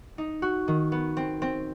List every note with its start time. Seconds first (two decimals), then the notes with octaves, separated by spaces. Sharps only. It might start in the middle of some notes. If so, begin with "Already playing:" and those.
0.18 D#4
0.42 F#4
0.68 D#3
0.92 B3
1.17 C4
1.42 C4